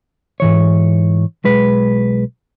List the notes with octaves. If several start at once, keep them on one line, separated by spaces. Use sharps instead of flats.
G#2 E3 C#5
B1 G#3 B4